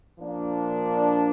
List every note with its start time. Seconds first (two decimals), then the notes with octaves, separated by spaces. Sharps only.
0.18 A#2 F3 A#3 D4